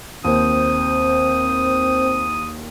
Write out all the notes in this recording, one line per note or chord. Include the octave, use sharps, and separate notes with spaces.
D#2 C4 C5 D#6